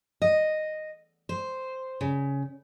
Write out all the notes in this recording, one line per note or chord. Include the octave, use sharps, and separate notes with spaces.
D#5
C5
C#3